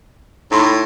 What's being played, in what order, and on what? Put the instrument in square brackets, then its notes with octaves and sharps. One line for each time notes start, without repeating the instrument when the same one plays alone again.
[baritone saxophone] A2 [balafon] D#4 B5 C6